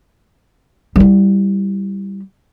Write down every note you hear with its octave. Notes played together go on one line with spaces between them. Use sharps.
G3 E4